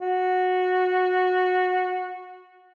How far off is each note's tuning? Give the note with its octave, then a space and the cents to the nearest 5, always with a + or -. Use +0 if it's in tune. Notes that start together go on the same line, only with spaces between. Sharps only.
F#4 -15